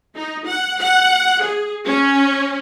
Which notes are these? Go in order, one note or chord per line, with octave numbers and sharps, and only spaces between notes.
D#4
F#5
F#5
G#4
C#4